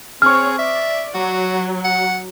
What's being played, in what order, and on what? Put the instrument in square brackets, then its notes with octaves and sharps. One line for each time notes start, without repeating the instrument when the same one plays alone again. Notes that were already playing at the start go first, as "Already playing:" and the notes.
[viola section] C4 C#5 [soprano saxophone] G#4 [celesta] C#6 F6
[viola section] D5 [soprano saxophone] E5
[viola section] F#3 [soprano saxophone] F#4
[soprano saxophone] F#5